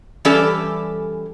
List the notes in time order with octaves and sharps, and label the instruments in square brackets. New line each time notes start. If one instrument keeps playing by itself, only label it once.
[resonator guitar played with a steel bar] E3 G3 C#4 G4 A4 D5